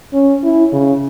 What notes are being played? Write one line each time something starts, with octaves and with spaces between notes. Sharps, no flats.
C#4
E4
C#3